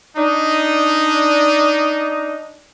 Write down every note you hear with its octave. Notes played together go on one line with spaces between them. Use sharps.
D4 D#4